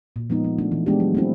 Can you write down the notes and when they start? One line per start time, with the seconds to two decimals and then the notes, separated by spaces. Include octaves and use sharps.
0.16 A#2
0.30 F3 G#3 B3 D#4
0.44 F3
0.58 A3 D4
0.72 E3
0.86 G#3 B3 D4 G4
1.00 F#3
1.15 A3 C4 E4